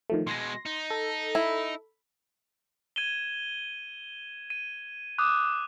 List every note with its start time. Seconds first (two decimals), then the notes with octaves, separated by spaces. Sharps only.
0.10 D#3 F3 A3
0.27 B2 G#3 C6 A#6
0.66 D#4
0.90 A4
1.35 E4
2.96 G#6 D#7 E7 G7
4.50 D#7
5.18 D6 D#6 F#6